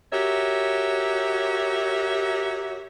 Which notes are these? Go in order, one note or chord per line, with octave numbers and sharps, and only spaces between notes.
F#4 G4 A#4 C#5 E5